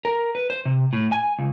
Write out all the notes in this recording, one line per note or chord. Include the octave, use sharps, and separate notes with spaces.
A#4
B4
C5
C3
A2
G#5
C#2